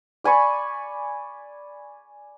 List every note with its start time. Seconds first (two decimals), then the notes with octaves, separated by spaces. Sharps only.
0.24 D5 G#5 B5 C#6